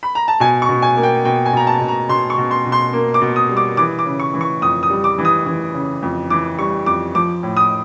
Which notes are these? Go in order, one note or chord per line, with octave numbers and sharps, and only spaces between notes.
B5
A#5
A5
B2 G#5
C#6
B2
G#5
A#3
G5
B2 G5
G#5
B2 A#5
A5
B2
A#5
B2 C6
C#6
B2
C6
B2
C6
A#3
D6
B2
D#6
G3
D6
E3 D6
D6
C#3
C#6
E3
C#6
F2 D#6
D#6
G3
D6
E3
D#6
E3
C#3
F2
E3 D6
G3 C#6
F2 D6
F3 D6
A2
D#6